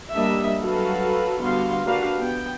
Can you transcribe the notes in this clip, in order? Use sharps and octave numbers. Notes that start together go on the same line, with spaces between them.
G3 A#3 D4 D#5 E5
F#3 F#4 A4 B4 F5
D3 G3 B3 F#4 F5 C6
A#3 D4 F#4 G4 B4 F5
B3 G5